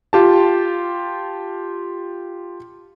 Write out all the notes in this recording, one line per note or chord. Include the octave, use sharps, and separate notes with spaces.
F4 G4 A5